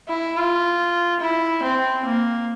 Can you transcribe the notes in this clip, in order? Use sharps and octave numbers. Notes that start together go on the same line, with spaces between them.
E4
F4
E4
C4
A#3